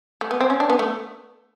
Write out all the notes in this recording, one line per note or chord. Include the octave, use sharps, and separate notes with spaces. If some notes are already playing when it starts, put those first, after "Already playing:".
A3
B3
C4
C#4
D4
B3
A3